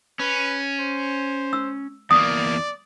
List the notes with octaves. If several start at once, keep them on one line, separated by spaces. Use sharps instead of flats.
C#4 B4
C5
E6
E2 A#3 D5 D#6